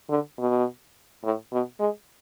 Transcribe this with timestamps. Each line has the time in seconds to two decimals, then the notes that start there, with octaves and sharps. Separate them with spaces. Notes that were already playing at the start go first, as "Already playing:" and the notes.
0.10 D3
0.38 B2
1.24 A2
1.52 B2
1.80 G#3